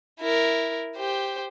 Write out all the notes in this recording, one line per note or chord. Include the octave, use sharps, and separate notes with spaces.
E4 A#4
G4 C5